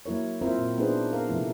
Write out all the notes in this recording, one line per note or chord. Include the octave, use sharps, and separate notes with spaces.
F#3 A#3 E4 A#4 C#5
C4 E4 F4 A#4 C5 E5
A#2 C4
B3 D4 D#4 G#4 B4 C5
B3 A#4 F5
C3 F3 A3 E4